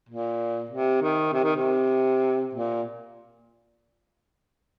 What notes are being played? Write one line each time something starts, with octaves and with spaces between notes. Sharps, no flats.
A#2
C3
D#3
C3
D#3
C3
A#2